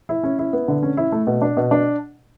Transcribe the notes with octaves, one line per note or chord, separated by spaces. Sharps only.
E4
C#4
E4
B3
D3
C#4
E4
A3
B2
D4
B2
D4